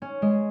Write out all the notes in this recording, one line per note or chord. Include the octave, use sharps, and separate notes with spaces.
C#4
G#3